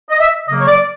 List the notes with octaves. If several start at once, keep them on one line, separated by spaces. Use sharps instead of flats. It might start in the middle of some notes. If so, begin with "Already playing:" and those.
D#5
E5
C#3 F#3 A#3 D#5
C#5
D5